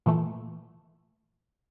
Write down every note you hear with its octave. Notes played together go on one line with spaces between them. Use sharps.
A#2 E3 A3